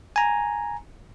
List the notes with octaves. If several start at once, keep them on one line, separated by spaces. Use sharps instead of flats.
G#5 A#5